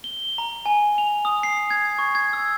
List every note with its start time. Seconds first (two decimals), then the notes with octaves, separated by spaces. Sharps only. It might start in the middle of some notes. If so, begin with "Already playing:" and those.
0.04 G7
0.38 A#5
0.66 G#5
0.98 F7
1.25 D#6
1.43 C7
1.70 G#6
1.99 C#6
2.15 G#6
2.33 E6